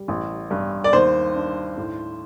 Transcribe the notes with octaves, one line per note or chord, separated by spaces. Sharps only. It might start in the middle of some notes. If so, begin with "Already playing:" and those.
Already playing: G3
A1
G2
D5
D#2 C5
D4
A2